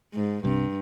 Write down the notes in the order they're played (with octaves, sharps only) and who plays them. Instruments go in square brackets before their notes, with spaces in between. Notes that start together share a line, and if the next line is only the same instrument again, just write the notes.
[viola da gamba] G#2
[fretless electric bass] C2 C3 F3 C4 [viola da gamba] G2